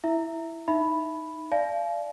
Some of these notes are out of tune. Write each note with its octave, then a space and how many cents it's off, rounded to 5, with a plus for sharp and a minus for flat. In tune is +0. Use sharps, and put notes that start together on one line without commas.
E4 +0 E5 +0
D#4 +0 E5 +0 B5 +0
D5 +0 F5 -25 A5 -45